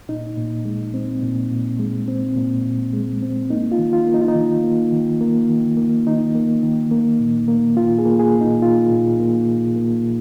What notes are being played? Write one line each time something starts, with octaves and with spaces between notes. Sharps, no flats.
A#2 D#4
A#2
G#3
C4
A#2
A#2
G#3
C4
A#2
A#2
G#3
C4
A#3 D#4
F4
D#3
F4
A#3
D#4
F4
D#4
D#3
A#3
D#3
A#3
D#3
A#3
D#3 D#4
A#3
D#3
A#3
A#2
A#3
A#2 F4
G#4
A#3
G#4
A#2
D#4
A#3 F4
A#2
A#3
A#2
A#3
A#2